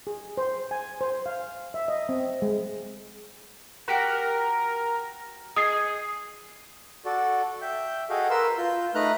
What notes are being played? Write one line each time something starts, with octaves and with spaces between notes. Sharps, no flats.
G#4
C5
G#5
C5
F5
E5
D#5
C4
G#3
F#4 G4 A#4 F#5
D#4 G#4 D#6 C7
F#4 A4 D5
E5 G5 G6
F#4 G#4 A4 D#5 F5 G5
A#4 B4 C6 E6
F4 G6
A3 D#4 B4 A#5 F6 F#6